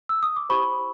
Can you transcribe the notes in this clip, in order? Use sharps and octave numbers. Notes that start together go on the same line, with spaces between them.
E6
D#6
D6
E4 G4 C5 B5 C#6